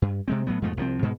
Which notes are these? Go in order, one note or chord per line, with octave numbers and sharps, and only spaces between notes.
G2
C3 G#3 C4
A2 F#3 B3
F2 G#2 B2 A3
C2 F3 F#3 C4
G#2 B2 G#3